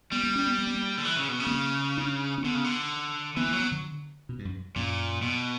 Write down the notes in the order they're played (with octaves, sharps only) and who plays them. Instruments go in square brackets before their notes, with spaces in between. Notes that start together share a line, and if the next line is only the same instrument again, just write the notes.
[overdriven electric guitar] G3 [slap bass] B3
[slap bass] A#3
C#4
B3
A#3
B3
A#3
[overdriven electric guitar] D3
E3
C#3
B2
C#3
[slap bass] B3
A#3
D4
C#4
[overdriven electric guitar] D3 [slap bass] B3
[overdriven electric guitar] C#3
D3
[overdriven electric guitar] E3 [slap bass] B3
[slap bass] A#3
[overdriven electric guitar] F#3
[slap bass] B3
D3
B2
G2
F#2
[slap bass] F#2 [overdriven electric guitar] A#2
[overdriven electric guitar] B2